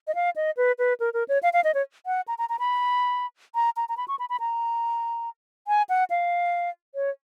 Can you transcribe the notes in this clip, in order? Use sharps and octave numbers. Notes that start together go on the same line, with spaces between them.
D#5
F5
D#5
B4
B4
A#4
A#4
C#5
F5
F5
D#5
C#5
F#5
A#5
A#5
A#5
B5
A#5
A#5
A#5
B5
C#6
B5
B5
A#5
G#5
F#5
F5
C#5